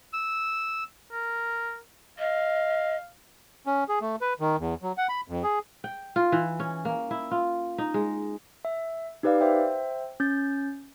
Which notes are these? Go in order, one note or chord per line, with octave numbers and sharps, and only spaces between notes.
E6
A#4
D#5 F5
C#4
G#4
A3
B4
D#3
E2
F#3
F#5
B5
F2
G#4
G5
F4
E3
C#4
A#3
E4
F4
D#4
G#3
E5
D#4 G4 B4 D5 F5
C5 E5 G5
C#4 G6 A6